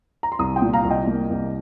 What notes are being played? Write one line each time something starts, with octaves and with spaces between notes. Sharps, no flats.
A#5
C6
C2 A#5 D#6
G5 C6
A#2
F5 A#5
C2
D#5 G5
A#3
C2